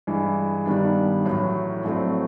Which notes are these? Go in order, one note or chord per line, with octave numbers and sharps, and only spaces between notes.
G2 E3 G#3
G2 D#3 G3 B3 D4
A1 A2 F#3
A#1 A2 F#3 A3 C4